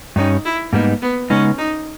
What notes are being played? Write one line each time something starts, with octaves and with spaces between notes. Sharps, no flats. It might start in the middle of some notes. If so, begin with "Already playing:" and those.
G2 G3 C#4 D#4
E4
G#2 G3 A#3 B3 D#4
B3
C#3 G#3 B3 C#4 D#4
D#4